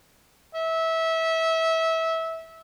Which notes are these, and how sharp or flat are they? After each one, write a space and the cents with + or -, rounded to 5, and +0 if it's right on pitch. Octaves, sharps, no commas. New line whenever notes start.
E5 -20